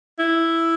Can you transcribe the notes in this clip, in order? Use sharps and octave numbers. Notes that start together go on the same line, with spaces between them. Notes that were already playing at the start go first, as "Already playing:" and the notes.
E4